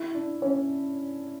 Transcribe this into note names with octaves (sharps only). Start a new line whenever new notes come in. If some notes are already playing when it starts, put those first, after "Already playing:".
Already playing: E4
D4
C#4